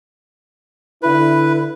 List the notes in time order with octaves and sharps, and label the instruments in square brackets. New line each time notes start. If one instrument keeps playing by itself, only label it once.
[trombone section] D3 E4 [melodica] B4